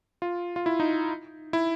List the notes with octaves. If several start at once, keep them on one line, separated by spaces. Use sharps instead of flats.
F4
F4
E4
D#4
E4